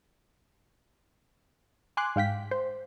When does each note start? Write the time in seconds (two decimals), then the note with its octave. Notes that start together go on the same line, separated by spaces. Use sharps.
1.97 G#5 C6 D6 F#6
2.16 G#2 F5 G5 B6
2.51 C5